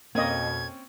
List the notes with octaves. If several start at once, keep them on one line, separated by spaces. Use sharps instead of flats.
F2 B2 A#3 C4 C#4 D#5 G#6